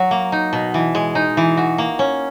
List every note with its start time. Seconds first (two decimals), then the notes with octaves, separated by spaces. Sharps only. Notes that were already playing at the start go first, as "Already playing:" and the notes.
Already playing: F#3 F#4
0.11 A#3
0.32 D#4
0.53 B2
0.74 E3
0.95 G#3
1.15 D#4
1.37 E3
1.57 F#4
1.78 A#3
1.99 C#4